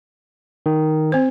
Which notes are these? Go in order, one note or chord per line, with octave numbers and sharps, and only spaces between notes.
D#3
C4 C5